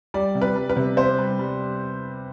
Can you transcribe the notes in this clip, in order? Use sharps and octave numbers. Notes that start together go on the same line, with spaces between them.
G3 D5
C3
B4
G3
B4
C3
C3 C5
G3
G3